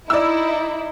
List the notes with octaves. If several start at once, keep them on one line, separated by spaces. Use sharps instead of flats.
D#4 E4 D5 E6